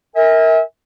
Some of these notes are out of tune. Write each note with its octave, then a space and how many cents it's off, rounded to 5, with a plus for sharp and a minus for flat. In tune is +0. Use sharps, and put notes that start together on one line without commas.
A#4 -5 E5 -35 G#5 -35